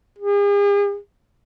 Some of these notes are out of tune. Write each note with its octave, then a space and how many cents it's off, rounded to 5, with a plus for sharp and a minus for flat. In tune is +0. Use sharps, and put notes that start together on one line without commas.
G#4 -45